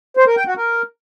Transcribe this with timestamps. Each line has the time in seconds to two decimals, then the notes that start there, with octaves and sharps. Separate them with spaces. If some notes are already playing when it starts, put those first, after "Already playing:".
0.17 C5
0.27 A#4
0.37 G5
0.47 F#4
0.57 A#4